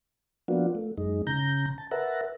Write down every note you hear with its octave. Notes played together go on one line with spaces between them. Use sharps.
F3 A#3 B3 D4 F4 F#4
A3
F#2 G#3 D#4
C#3 A#5 G6
A5
A#4 B4 E5 F#5 A5 A#5